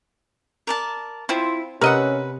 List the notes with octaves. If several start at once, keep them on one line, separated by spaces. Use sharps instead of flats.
A#4 D5 A5
F3 C4 E4 F4
C3 C#4 A#4 B4 D#5 F#5